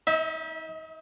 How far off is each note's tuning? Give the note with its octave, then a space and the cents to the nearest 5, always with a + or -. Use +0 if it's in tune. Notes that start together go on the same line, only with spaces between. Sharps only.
D#4 +35 E5 -25